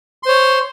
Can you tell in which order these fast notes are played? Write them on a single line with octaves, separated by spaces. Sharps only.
C6 C5 C#5